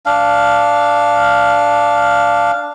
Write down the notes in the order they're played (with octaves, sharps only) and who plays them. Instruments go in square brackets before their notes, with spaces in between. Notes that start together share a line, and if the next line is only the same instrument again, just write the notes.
[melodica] D4 F5